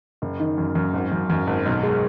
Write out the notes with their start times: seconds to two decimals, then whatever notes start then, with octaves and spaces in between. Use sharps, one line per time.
0.22 F#1
0.40 D#3
0.58 F#2
0.75 F#2
0.94 G#1
1.12 F#2
1.30 F#2
1.47 G#1
1.66 B1
1.83 G#3